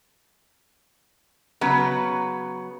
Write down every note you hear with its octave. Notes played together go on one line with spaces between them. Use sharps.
C#3 F#3 B3